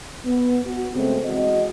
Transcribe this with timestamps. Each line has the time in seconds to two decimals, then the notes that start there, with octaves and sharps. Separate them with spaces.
0.24 B3
0.65 F#4
0.94 C#3 G#3 A3 C4
1.24 E3 G#3 F#4 D#5